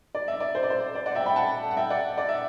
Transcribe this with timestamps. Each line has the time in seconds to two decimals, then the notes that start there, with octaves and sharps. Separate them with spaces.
0.15 D5
0.28 E5
0.40 D5
0.55 C5
0.63 D5
0.70 C5
0.95 D5
1.06 D5 F#5
1.15 E5 G5
1.26 G5 B5
1.36 F#5 A5
1.71 F#5
1.77 E5 G5
1.90 D5 F#5
2.17 D5
2.29 E5